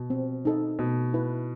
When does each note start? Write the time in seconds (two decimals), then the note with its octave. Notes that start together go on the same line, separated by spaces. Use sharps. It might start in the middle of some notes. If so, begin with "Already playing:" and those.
Already playing: B2
0.10 C4
0.45 D#4 A4 D#5
0.79 B2 A3
1.14 E4 B4